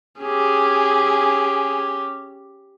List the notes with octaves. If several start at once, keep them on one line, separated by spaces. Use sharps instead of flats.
C#4 G4 G#4